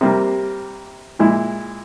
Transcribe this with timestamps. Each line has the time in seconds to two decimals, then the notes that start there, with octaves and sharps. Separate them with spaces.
0.01 C3 G3 A#3
1.19 A#2 G#3 E4